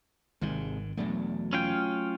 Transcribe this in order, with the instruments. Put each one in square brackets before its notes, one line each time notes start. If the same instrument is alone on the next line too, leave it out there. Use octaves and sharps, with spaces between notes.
[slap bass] G#1 G#2 D#3 [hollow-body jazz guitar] C3 G#3
[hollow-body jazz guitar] E2 B2 D4 [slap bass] F#3 A3
[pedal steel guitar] C#4 F4 G5